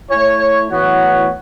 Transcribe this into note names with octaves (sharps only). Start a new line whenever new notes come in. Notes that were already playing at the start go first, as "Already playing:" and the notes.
A3 E4 C#5
A2 E3 B3 F#4 C#5